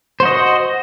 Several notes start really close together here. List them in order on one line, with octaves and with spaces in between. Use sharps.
C5 F#4 D#5